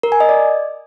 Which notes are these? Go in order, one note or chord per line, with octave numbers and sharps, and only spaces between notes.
A#4
G#5
D#5
D5